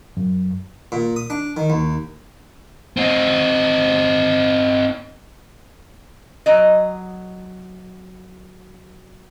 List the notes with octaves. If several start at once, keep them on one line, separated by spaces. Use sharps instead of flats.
F#2
A#2
D#6
D4
D#3
D#2
C4 D#4
F#3 D#5